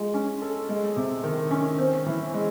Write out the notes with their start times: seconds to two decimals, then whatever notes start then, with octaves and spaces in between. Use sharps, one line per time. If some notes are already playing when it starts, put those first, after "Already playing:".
Already playing: G#3 F4
0.14 C#4
0.42 A4
0.69 G#3
0.96 C3
1.23 D#3
1.51 C#4
1.78 C4
2.06 E3
2.34 G#3